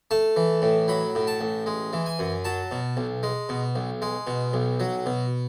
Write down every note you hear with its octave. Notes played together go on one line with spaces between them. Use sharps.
A3 A5
E3
A2
F#3 B5
A2
A5
A1
G#3
E3
G#5
F#2
F#3 A5
B2
B1
G#3
B2
B1
G#3
B2
B1
F#3
B2